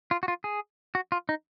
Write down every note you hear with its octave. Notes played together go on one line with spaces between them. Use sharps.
F4
F#4
F4
G#4
F#4
F4
D#4